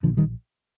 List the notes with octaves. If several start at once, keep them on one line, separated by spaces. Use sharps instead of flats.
A#1 A#2 D3 F3
D#3 G3